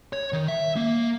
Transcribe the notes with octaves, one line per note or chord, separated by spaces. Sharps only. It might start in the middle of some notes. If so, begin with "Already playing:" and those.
C#5
D#3
E5
A#3